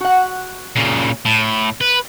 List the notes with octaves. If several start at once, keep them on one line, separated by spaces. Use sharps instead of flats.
F#4 F#5
A#2 C#3
A2
B4